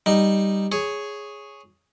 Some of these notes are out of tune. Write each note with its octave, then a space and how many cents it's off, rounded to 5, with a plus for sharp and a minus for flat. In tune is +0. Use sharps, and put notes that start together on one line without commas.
G3 +0 D#4 +0
G#4 +0 C#5 +0